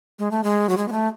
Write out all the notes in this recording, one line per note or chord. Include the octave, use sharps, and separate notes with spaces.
G#3
A3
G#3
F#3
G#3
B3
A3